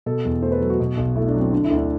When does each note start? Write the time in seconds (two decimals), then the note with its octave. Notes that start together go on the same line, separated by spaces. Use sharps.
0.06 B2 A4
0.25 E2
0.42 A3 C5
0.52 B4
0.61 F#3 A4
0.70 F#4
0.80 B2
0.97 B1
1.16 A3 E4
1.28 D4
1.34 F#3
1.40 C4
1.52 D3 D4
1.64 E4
1.71 D2
1.77 D4